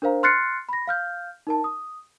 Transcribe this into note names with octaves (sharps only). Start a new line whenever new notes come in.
D4 A#4 C5 F5 A#5
C6 F6 F#6 A6 C7 C#7
B5 A#6
F5 F6 G6
D#4 A#4 A5
D#6